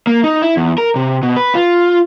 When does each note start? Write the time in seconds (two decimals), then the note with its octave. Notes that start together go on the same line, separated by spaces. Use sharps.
0.07 A#3
0.24 D#4
0.42 E4
0.57 E2
0.78 A#4
0.96 C3
1.23 B2
1.36 B4
1.55 F4